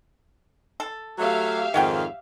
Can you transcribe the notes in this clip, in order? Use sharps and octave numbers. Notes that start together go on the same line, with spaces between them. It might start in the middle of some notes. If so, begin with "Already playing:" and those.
A4
F#3 A3 G4 E5 F5
F2 G#2 D#3 C#5 F#5 G5